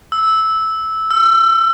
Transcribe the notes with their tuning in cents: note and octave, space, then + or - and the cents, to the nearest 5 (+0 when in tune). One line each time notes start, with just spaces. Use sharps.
E6 -10
E6 +35